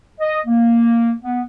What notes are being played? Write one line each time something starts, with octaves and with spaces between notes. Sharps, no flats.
D#5
A#3
B3